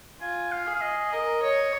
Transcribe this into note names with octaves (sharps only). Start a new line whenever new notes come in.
F4 G#5
F5
G#4
F5
D#5
A#4 D#5
C#5 D#5